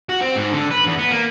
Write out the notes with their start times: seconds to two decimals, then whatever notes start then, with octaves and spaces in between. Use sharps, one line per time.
0.09 F#4
0.21 C4
0.37 G#2
0.53 D3
0.71 B4
0.86 E2
0.98 B3
1.11 A#3